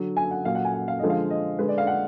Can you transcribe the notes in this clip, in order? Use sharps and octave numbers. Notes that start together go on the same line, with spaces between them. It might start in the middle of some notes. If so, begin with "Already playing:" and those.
Already playing: D3 F#3
G#5
F#5
A#2 F#3 F5
F#5
G#5
F#5
F5
D3 F3 G#3 D#5
F5
D#5
D3 G#3 B4
D5
F5
F#5